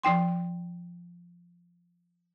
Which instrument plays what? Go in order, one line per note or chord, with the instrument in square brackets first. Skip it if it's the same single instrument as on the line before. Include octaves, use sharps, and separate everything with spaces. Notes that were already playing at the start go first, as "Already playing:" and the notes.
[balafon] F3 D#4 G5 C6